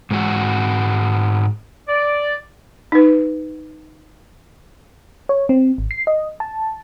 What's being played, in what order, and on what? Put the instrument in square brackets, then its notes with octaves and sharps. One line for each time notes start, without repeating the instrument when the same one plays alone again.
[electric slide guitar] G#2 G#3 F#4
[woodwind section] D5
[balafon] D#4 B4
[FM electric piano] C#5
C4
G#1
C7
D#5
A5